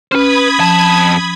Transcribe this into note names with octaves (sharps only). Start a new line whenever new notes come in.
C#4 B4 C5 B5 D#6 F6 G#6
F2 F3 A5